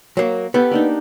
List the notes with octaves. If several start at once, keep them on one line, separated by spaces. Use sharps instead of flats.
F#3 A#3
B3 G4 A4
A#3 D4 D#4